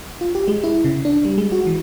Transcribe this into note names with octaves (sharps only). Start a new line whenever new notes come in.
F4
G4
G#3
E4
C#3
D4
G3
G#3
F#4
E3